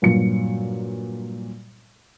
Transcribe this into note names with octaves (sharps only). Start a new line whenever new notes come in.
G2 A#2 F#3 C#7